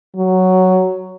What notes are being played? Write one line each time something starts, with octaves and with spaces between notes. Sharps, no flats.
F#3